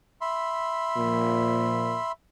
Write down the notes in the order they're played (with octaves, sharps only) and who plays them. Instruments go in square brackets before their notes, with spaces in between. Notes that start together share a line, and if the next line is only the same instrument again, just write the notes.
[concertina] E5 B5 C6
[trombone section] A#2 F3